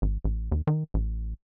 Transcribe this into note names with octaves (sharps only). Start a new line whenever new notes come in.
G#1
A1
D#2
D#3
A1